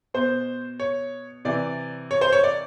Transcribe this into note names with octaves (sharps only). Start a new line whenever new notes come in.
B2 C5
C#5
C3 E3 D5
C#5
C5
C#5
D5